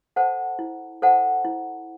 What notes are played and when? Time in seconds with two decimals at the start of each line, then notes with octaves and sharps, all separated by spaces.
0.16 A4 C5 F#5 A5
0.59 E4
1.02 A4 C5 F#5 A5
1.45 E4